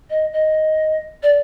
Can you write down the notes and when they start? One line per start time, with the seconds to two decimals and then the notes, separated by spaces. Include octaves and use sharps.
0.10 D#5
0.33 D#5
1.23 D5